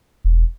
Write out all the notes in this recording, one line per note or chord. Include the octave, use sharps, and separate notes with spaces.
E1